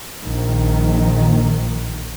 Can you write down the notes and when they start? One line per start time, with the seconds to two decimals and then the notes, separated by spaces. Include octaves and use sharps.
0.21 A#1 D#3